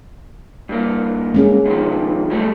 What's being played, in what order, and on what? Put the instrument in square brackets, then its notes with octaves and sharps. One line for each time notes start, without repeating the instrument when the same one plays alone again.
[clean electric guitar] G2 A#3
[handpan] G#3 C#4 G#4
[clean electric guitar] B2 D#3 F3
F#3 G3 A3